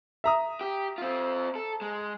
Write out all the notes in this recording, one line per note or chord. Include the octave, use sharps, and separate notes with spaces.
E5 A#5 D#6
G4
C4 F4
A4
G#3